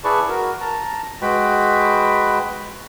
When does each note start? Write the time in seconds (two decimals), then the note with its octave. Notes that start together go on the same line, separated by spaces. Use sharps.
0.04 E4 G#4 B4 D5 A5 C#6
0.29 F#4 A#4
0.61 A5 A#5
1.22 G#3 F#4 B4 G5 B5